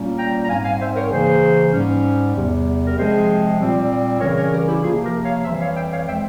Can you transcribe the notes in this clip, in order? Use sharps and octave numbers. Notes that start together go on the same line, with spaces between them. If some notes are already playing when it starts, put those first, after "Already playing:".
Already playing: A#2 G3 A#3 C#4
G5 A#5
A#5
G#2 G3 C4 F5 G#5
F5 G#5
C5 E5
A#4 C#5
C#3 E3 A#3 G#4 C5
G#2 G3 C#4
E2 C3 G3
A#4
C3 F3 G#3 C4 G#4 C5
A#2 G3 C4
C#3 E3 G3 C#4 A#4 C#5
A#4 C#5
G4 A#4
E4 G4
C3 F3 A#3 F4 G#4
G4 A#4
C#5 F5
F2 E3 G3 C5 E5
C#5 F5
E5 G5
C#5 F5
F3 G#3 C4 E5 G5